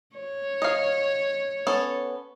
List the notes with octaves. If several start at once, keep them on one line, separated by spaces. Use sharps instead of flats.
C#5
D#5 F5
B3 C#4 A4